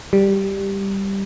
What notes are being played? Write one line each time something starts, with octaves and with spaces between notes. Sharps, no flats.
G3